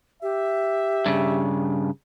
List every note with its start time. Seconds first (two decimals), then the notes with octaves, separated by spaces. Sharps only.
0.23 G4 E5
1.06 G2 C#3